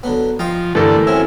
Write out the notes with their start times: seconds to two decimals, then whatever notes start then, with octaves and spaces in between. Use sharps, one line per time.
0.03 D3 F#3 B3
0.39 F3 D#5 G5 C6
0.75 G2 D3 E3 A3 A4 A#4
1.07 F#3 C4 C#4 E4